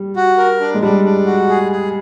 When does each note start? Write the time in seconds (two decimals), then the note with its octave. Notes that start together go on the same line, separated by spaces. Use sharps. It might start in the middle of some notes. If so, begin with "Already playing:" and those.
Already playing: G3
0.16 F#4
0.38 A#4
0.60 D4
0.74 G#3
0.82 G3 D4
1.04 D4
1.26 F#4
1.49 G#4
1.72 G#4